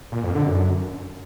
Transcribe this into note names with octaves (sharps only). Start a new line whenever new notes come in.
A#2
F2
D3
F#2